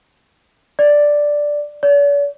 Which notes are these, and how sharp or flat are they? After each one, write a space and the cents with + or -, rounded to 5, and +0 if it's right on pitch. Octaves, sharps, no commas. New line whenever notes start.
D5 +0
D5 -45